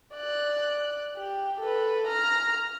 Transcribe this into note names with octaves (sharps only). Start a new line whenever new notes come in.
D5 F#6
G4
A4 B4
A#5 F6